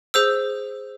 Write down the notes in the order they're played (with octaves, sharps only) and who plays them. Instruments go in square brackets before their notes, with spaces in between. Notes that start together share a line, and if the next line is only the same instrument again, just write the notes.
[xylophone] G#4 C5 E6